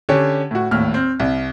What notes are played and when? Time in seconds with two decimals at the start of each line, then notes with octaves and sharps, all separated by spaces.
0.09 D3 C#4 G4 C#5
0.51 A2 F#4
0.71 G#1 D#2 A2 F6
0.94 C4
1.20 C2